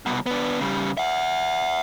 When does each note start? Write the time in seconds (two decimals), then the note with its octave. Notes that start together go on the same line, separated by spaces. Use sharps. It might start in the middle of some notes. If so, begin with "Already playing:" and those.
0.06 C2 B2
0.26 B3 D4
0.60 C#3 G3
0.97 E5 F#5